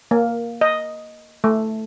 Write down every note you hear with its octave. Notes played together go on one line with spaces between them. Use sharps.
A#3
D#5
A3